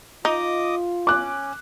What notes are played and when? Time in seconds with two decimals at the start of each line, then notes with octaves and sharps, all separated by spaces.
0.25 D#4 F4 D#5 D6 D#6
1.07 C#4 D6 F#6